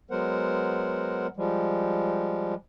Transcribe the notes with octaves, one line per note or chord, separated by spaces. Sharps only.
F#3 G#3 B3 A#4 C5 F#5
F3 G3 G#3